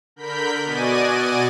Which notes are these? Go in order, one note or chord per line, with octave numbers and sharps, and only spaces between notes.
D3 A#4 B5 G6 B6
B2 F#4 D5 D#5 G#5 D#7